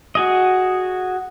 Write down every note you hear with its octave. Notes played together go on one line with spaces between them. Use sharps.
F#4 G#4 D#5